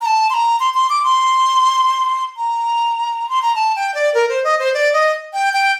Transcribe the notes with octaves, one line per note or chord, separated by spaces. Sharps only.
A#5
A5
C6
A#5
C6
C6
D6
C6
A#5
C6
A#5
A5
G5
D5
A#4
C5
D#5
C5
D5
D#5
G5
G5